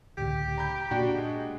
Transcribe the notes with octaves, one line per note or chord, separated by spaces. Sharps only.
C#2 A2 D3 G4
A#5 B5 G6
A#2 D4 F#4 G5
G#3